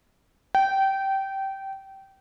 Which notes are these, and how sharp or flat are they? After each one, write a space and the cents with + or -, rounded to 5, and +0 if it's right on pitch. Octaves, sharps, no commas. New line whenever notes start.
G5 -20